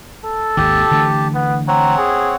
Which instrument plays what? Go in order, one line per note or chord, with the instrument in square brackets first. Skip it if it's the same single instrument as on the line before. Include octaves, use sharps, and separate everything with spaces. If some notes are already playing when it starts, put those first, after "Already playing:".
[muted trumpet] A4
[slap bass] G#1 D#2 [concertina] G4 A5
[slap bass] D3 E3 A3
[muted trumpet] B3
[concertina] C4 C#5 F#5 [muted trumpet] A#5
[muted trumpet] G#4